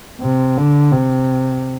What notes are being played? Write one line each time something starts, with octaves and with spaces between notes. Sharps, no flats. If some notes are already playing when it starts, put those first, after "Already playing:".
C3
D3
C3